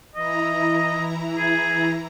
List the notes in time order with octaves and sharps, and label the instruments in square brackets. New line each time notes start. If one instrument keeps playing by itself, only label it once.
[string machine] E3 E4 A#5 [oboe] D#5
[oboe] G#4